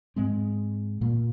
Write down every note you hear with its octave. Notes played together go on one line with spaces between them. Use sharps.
G#2 G#3 C4
A#2 A#3